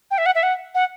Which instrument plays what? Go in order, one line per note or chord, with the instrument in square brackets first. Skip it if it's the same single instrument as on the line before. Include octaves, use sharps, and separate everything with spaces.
[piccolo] G5
E5
F#5
E5
F#5
F#5